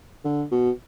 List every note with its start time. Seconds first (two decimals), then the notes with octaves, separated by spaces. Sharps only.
0.25 D3
0.51 B2